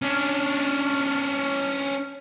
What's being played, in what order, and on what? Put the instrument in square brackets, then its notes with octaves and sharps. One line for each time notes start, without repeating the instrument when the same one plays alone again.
[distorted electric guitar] C#4 D4